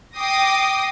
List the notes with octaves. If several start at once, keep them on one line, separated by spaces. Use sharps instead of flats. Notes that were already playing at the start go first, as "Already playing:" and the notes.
G5 D6 D#6 A#6 C7